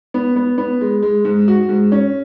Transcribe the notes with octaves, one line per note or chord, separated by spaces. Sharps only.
B3
B3
B3
G#3
G#3
G#2
F#4
G#2
C#4